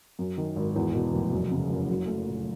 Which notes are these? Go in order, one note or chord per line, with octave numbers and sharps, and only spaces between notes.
F#2
D#3
G#1
E2
B2
F1
F#2
C#3
F#1
F#3
A3
A#2